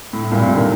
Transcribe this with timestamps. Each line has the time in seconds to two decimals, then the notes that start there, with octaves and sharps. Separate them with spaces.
0.13 A2
0.24 A2
0.32 G2 A#2
0.40 A2 C3
0.47 A#2 D3
0.56 C3 D#3